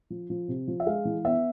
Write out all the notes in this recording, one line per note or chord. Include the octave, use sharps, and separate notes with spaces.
F3
F3
C3
F3
E5
G#3 F5
E3
B3 E5